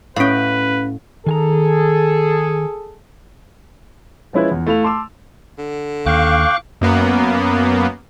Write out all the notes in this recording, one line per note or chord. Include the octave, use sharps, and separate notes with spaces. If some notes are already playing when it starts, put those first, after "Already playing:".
A2 C#4 B4 F5 G5
D#3 G#4 A4 G#5 A#5
F3 G#3 C#4 E4 F4 B4
E2
A3 E4 F5 F7
A5 C6 D6 E6
D3
D#2 F5 G5 C#6 D6 F#6
F#2 A#3 B3